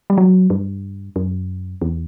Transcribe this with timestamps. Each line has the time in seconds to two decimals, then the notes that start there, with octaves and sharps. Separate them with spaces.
0.10 G3
0.18 F#3
0.50 G2
1.16 F#2
1.82 E2